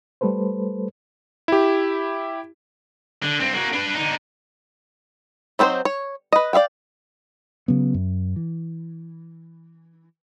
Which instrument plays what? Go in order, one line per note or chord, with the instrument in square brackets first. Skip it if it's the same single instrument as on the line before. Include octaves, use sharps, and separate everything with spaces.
[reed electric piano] G3 A3 A4 B4 C5
[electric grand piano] E4 G4
[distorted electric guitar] D3
G2 C4
A#3 F#4
D4 B4
D3 D#4
[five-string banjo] F#3 C4 D4 D#4 C5
C#5
B4 D#5
D5 E5 F5 G5
[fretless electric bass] C#3 F#3 B3
F#2
E3